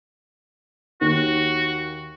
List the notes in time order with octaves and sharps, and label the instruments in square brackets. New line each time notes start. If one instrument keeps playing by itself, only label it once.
[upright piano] D#2 [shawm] F#4